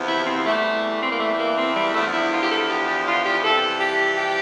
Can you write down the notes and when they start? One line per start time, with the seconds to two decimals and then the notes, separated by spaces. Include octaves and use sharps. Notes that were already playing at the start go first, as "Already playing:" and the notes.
Already playing: E2 C3 F3
0.08 E4
0.26 C4
0.45 E2 E3 G3 A3
1.03 C4
1.11 A#3
1.20 A3
1.39 A#3
1.58 C4
1.76 G3
1.94 E2 D3 F3 A3
2.13 E4
2.32 F4
2.42 G4
2.51 A4
2.68 G4
2.87 G4
3.06 F4
3.25 G4
3.44 F2 C3 E3 G3 A4
3.80 G4
4.18 G4